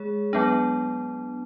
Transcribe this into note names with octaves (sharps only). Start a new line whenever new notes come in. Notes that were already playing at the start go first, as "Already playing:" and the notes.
Already playing: G#3 G#4 C#5
F#3 B3 D4